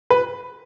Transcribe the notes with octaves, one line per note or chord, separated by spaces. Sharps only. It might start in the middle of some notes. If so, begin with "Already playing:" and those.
B4